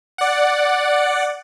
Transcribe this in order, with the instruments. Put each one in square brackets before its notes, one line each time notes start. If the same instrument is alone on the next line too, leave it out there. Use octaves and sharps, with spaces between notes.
[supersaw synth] D5 F#5